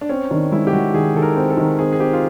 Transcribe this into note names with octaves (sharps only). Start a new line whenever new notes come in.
D4
C4 C#4
D#3 D4
G#3 E4
G4
G#3 F#4
D#3 G#4
D#3 A4
A#4
C4
A4
D#3
C4 G#4
G#4
C4 G4
F4